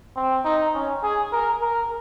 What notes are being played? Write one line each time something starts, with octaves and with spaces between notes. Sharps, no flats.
C4
D#4
C#4
G#4
A#4
A#4